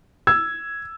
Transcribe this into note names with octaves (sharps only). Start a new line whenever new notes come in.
E6 G#6